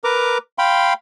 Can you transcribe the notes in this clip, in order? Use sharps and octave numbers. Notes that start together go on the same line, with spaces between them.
A#4 B4 A#5 D6
F5 G5 B5 C6